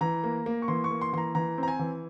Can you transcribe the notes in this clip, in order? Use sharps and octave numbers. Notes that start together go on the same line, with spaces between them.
E3 A#5
A#3
A#3
C#6
E3 C6
C#6
A#3
C6
E3 A#5 C6
E3 A#5
C4
A#5
G#5
E3